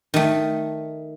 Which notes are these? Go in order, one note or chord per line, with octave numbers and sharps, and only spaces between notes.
D#3 A3